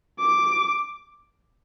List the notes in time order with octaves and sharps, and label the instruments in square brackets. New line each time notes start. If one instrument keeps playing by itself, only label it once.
[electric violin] D6